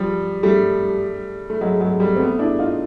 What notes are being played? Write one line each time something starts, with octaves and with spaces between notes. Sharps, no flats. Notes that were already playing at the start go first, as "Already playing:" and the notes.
Already playing: F3 G3
G3 A3
A3
F#3 G#3
F#3 G#3
G3 A3
C4
A3 B3
D4 E4
D#4 F4